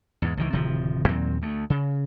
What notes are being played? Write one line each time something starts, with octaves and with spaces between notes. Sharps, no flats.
E2 G#2
C#2 D#3 E3
D1 C3 D#3 F3
D#2 A#2 F#3 C4
D2 A3
C#3